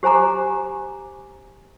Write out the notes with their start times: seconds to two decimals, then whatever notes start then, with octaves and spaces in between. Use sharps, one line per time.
0.03 G4 C5 G#5 A#5 D6